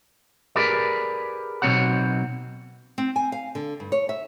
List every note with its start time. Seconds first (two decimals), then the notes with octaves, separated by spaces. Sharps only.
0.56 G4 G#4 A#4 B4 D5
1.62 B1 B2 B3 C4 C#5 F#5
2.98 C4
3.16 G#5
3.32 F5
3.55 D3
3.80 G2
3.92 C#5
4.09 E5